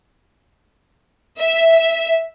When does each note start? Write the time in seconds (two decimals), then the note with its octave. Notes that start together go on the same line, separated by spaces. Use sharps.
1.39 E5